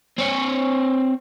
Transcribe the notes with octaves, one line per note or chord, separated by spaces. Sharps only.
C4 C#5